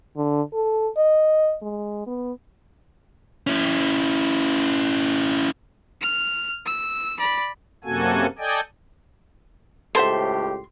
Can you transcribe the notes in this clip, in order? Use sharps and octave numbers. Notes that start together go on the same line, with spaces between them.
D3
A4
D#5
G#3
B3
C#4 E4
F6
E6
D5 B5
F#2 C3 A#3 F#4 A4 G#5
A4 D5 D#5 G5 G#5
C#2 A2 G4 A4 C5 E5 C6